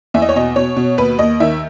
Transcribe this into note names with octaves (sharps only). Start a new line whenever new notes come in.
E2 E5
D#5
C#5
B2 D#5
B2 C#5
B2
D#2 B4
D#2 D#5
D#3 E5